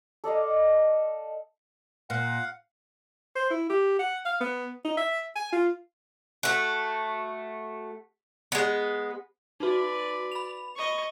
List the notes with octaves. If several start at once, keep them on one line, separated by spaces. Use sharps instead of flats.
A4 D5 D#5 F5
A#2 F5 F#5
C5
E4
G4
F#5
F5
B3
D#4
E5
G#5
F4
A3 F#4
G#3 B3
D#4 F#4 B4 D5
B5 F7
D#5 C#6